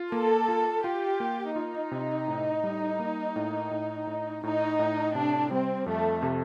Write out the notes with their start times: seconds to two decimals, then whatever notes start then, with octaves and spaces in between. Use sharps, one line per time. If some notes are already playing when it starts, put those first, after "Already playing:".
Already playing: F4
0.12 A#3 A4
0.48 F4
0.84 F4 G4
1.20 A#3
1.56 D#4 F4
1.91 C3
2.28 A2
2.64 G3
3.00 A#3
3.36 A2
3.71 A2
4.07 A2
4.43 A2 D#4
4.79 A2
5.15 C3 D4
5.51 G3 C4
5.86 F2 A3
6.23 C3